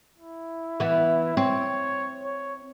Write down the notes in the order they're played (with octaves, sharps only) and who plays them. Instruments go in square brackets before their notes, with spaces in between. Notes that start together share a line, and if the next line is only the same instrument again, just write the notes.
[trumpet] E4
[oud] E3 B3
[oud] C4 [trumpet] C#5
[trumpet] C#5